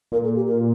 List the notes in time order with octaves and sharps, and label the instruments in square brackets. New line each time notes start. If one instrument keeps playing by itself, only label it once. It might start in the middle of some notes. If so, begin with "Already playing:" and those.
[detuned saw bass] A#2 [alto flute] A#4
[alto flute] A4
G4
A#4